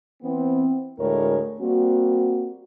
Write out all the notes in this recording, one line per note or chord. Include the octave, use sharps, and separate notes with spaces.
E3 B3 C4
D2 A2 G#3 A#4 C#5
G3 A#3 C4 F#4